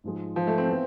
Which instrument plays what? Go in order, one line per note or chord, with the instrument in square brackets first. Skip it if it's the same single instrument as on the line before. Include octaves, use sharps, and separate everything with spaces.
[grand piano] G#2 F3 G#3
[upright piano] F3
A3
C4
[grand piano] E3 B3